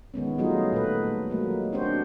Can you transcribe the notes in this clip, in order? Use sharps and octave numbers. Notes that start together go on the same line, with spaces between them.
D#3 G#3 B3 C#4
F#3 G3 A3 D#4 F4 G#4
A#2 A3 B4
F#3 G#3 A#3
C4 D4 F#4 G4 C5